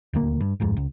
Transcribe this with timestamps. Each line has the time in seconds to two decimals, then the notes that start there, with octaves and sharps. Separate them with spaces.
0.13 D#1 D2 A#3
0.40 G2
0.60 D1 F2 G#2
0.77 C#2